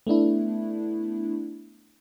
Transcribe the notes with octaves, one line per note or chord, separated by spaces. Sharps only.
A3 B3 D4 E4